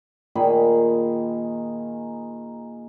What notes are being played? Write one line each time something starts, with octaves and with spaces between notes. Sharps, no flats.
A#2 D#3 G#4 B5